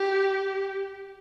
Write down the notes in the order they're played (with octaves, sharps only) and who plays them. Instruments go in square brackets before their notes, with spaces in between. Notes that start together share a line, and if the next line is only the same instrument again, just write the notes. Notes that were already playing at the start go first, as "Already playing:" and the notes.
Already playing: [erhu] G4